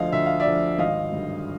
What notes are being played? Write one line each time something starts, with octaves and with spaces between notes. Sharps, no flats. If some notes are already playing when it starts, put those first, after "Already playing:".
Already playing: D2 D3 F3 D#5 F5
D2 E5
F5
D5 E5
D3 F3
G#1 D#5 F5
G2 D3